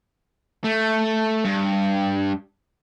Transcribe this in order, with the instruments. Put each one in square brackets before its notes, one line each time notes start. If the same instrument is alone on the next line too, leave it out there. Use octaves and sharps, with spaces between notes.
[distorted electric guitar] A3
G2